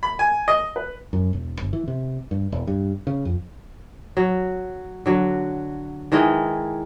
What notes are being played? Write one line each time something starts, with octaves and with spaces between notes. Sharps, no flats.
B5
G#5
D#5
B4
F#2
E1
G1
E3
C3
G2
E1
G2
C#3
F2
F#3
D3 F#3
D#3 E3 G#3 D#5